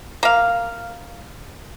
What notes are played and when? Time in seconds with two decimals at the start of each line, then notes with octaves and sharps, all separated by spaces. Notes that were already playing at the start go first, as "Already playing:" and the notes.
0.23 A#3 F5